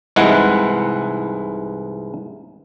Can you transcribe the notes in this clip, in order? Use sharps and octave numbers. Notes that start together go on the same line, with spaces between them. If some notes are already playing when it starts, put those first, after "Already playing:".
C2 G#2 E3 G#3 E4 F#5